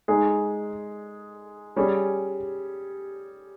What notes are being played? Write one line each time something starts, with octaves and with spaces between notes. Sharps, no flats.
G#3 D#4 G#4
G3 C#4 G#4